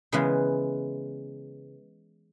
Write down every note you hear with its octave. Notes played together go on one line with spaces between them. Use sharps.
C#3 E3 G#3 B3